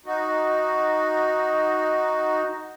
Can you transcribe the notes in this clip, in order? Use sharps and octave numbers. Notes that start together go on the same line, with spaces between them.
D#4 F#4